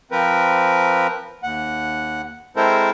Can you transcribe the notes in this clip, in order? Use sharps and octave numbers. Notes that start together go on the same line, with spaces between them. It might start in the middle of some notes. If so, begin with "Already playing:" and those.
F3 C4 A#4 B4
D#2 F#5
G#3 C4 E4 A4 A#4 C5